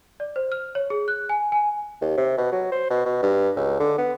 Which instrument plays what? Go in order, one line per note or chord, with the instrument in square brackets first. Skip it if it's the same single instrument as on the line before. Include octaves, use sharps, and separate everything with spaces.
[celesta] D5
C5
F6
C#5
G#4
F#6
G#5
G#5
[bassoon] D#2
C3
B2
F#3
C5
B2
B2
G2
C#2
D3
B3